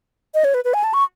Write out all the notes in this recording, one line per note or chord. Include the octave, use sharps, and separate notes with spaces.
D#5
C#5
B4
B4
G#5
A5
C#6